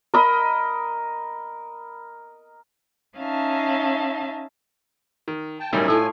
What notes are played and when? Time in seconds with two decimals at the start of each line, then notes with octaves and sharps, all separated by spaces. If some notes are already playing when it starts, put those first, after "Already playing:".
0.14 A#4 D#5 B5
3.17 C#4 D#4 E5 F5 A5
5.28 D#3
5.60 G5 A5
5.73 B1 A2 G3 C#4 D#4 A#4 D5 G#5
5.88 A2 A3 E4 F4 A4 G#5 E6